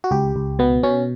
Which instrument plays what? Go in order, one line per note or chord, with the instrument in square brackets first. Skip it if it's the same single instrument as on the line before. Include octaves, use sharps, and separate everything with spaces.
[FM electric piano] F#4
C#2 G4
C#2
B2 B3
B2 C#4